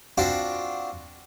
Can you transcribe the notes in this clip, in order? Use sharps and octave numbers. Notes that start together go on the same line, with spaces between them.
C4 D4 F4 F#4 C5